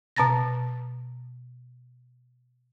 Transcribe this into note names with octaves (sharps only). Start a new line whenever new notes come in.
B2 A5 A#5 A6 A#6